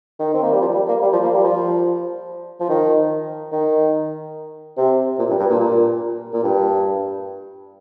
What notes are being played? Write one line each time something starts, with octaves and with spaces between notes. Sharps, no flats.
D#3
C4
A#3
G3
F3
G3
A#3
G3
F3
A#3
G3
F3
F3
D#3
D#3
C3
A#2
G2
G2
A#2
A#2
A#2
G2